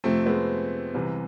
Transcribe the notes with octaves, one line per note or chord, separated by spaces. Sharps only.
F2 C3 F3 A3 C4
G#3 B3
C2 C3 E3